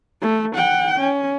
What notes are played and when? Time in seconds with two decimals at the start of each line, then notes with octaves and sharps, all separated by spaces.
0.22 A3
0.56 F#5 G5
1.00 C#4